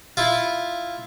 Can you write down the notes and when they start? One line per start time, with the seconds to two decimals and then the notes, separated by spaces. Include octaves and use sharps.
0.17 E4 F4